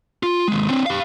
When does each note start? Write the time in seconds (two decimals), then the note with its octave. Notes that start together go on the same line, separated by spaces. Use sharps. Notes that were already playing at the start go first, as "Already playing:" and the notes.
0.23 F4
0.48 D#2 G#3
0.70 C4 D4
0.86 G4 F5